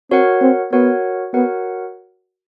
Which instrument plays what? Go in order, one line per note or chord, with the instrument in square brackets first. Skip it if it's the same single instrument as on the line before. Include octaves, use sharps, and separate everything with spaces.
[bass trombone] C4 [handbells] F#4 A#4 C#5 F#5
[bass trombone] C4
[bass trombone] B3 [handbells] F#4 A#4 C#5 F#5
[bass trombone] B3 [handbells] F#4 A#4 C#5 F#5